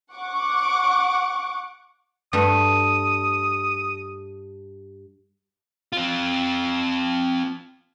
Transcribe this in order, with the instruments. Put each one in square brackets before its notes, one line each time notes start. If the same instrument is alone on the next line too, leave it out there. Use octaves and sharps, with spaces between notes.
[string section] F#5 C#6 D6
[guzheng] G2 A3 [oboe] D#6
[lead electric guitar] C4 F4